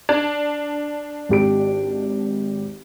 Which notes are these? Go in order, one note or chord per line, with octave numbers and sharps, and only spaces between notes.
D4
G#1 G4 D7